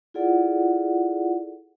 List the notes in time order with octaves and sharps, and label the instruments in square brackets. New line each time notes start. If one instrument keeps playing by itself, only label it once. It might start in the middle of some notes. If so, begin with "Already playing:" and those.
[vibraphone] E4 F4 G#4 A4 D5 F#5